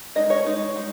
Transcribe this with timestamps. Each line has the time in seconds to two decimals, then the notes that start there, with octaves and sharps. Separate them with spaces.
0.15 G#3 D#4 D#5
0.30 C#5
0.46 G#3 D#4
0.76 G#3 D#4